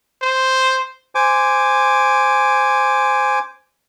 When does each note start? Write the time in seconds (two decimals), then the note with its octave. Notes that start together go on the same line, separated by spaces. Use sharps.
0.22 C5
1.15 C5 G#5 D6